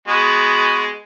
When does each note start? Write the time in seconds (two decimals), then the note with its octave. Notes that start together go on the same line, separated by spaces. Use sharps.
0.08 G#3 B3 F#4